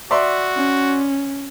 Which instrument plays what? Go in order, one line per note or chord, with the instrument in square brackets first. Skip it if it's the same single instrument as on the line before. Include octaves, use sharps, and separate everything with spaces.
[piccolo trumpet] F#4 [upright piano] D5 E5 C6
[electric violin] C#4